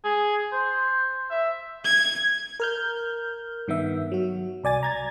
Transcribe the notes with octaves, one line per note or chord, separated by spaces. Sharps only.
G#4
C5
E5
G#6
A#4 F6 G6
G2 D#3 B3 E5
F#3 F#4
C2 D5 G#5 A6
A#5 G#6 A6